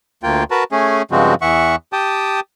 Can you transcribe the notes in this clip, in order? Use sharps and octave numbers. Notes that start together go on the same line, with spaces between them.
D2 A#3 F4 G5
F#4 A#4 B4 A5
A3 C#4 G#4
G2 C#3 F3 G#3 C4 F#4
E2 E3 E5 F#5 C#6
G4 G5 A5 D#6